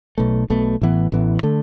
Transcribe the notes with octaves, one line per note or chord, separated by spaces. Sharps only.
B1 B2 A3
B1 B2 A3
A1 A2 E3 B3
A1 A2 E3 B3
D3 A3